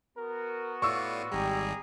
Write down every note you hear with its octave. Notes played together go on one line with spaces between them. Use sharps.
B3 F#4 A#4
A2 F4 D5 C#6 E6
G#1 G3 G4 G#4 A#5